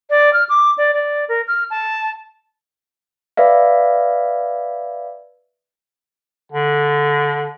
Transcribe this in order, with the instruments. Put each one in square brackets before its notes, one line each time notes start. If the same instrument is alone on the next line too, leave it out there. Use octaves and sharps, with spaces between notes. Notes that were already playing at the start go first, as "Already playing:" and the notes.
[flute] D5
F6
D6
D5
D5
A#4
F6
A5
[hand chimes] B4 D5 E5 F5
[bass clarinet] D3